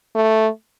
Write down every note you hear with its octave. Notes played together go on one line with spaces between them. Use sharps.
A3